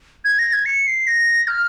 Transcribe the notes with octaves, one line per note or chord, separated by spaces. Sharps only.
G#6
A#6
G#6
C#7
C7
A#6
F6